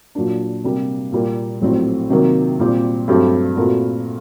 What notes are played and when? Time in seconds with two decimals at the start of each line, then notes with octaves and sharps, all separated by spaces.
0.15 A#2 F#3 A#3 D4
0.64 C3 G3 A#3
1.12 A#2 G3 A#3
1.61 A#1 A2 F#3 C4
2.10 C3 D#3 F#3 A#3
2.59 A#2 G3 C4 G4
3.08 G2 F#3 A3 C4 G4
3.56 A#2 A3 C4 F#4 A#4